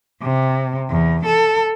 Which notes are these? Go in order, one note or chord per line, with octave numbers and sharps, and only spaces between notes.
C3
E2
A4